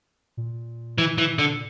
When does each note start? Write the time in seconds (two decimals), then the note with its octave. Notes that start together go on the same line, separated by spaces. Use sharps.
0.37 A#2
0.98 E3
1.18 E3
1.39 D3